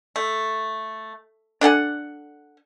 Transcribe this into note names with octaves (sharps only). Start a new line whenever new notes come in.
A3
D4 A4 F#5 G#5